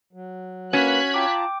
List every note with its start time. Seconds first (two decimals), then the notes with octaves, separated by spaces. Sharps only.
0.13 F#3
0.73 A#3 C#4 F#4 B4 F#6 G#6 B6
1.14 F4 G5 A5 A#5 D6